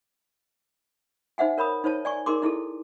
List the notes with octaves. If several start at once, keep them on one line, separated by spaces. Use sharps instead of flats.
D#4 C5 E5 F#5 G#5
A#4 C#5 B5 D#6
D#4 C5 C#5 A5
D5 G#5 C#6
D#4 G#4 A#4 C6 D6
D#4 E4 G#4 A4